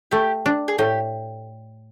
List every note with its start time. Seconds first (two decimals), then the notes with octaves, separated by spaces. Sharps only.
0.11 A3 G4
0.46 D4
0.68 G#4
0.78 A2 G4